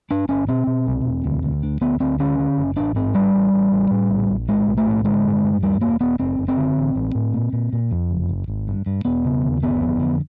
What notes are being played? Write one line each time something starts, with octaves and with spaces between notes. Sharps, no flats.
G2 D4
G1 C#4
B2 C4
B2
C2
E1
D2
D2
D3
D2 B3
D2 C4
D3 C#4
D3
F#1
A1 D4
G#2 C4
A1 G3
A1
A1
A1
A2
A#1
A#1
A2 G#3
B1
A3
A2
D3 G#3
G2
G2
D#2 G3
E1 A#3
E1 B3
F#1 C4
F#1
C4
D3
A1
A1
A2
A#2
A#2
A#2
F2
F#1
F#1
G#1
G2
G2
E1 B3
C#3
D#2
G1 B3
F2
D3